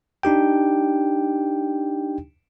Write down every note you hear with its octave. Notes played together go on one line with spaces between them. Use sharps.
D4 D#4 G4 G5